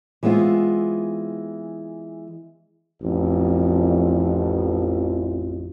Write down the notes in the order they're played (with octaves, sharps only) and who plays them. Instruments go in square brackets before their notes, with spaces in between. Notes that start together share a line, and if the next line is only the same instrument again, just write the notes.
[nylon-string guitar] E3 G#3 B3 C4 F4
[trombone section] A1 F2